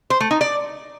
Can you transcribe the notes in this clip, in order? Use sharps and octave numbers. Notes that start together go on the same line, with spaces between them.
C5
A3
D#4
D5